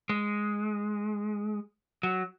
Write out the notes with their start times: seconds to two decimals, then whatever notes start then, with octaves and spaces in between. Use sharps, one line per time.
0.10 G#3
2.03 F#3